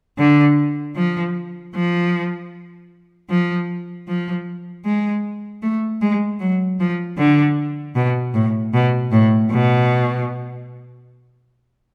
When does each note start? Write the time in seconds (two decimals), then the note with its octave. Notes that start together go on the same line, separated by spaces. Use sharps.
0.19 D3
0.96 F3
1.75 F3
3.30 F3
4.08 F3
4.85 G#3
5.62 A3
6.01 G#3
6.40 F#3
6.80 F3
7.18 D3
7.96 B2
8.34 A2
8.74 B2
9.12 A2
9.51 B2